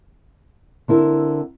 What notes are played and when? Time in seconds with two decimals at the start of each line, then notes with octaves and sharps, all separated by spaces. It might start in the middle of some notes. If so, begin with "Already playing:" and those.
0.88 D3 C4 E4 A#4